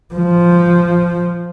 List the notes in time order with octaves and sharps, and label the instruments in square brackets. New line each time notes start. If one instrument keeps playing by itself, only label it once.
[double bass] F3